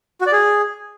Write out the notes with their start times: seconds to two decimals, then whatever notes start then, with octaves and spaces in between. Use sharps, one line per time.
0.21 F#4
0.27 D5
0.32 G#4